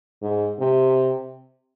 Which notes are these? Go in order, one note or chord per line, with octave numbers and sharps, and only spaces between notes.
G#2
C3